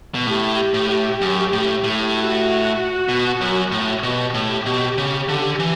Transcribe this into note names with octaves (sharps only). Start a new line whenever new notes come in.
B2
A2 G4
A2
F#2
A2
A2
F#4
B2
F#2
A2
B2 G4
A2
B2
C#3
D3
E3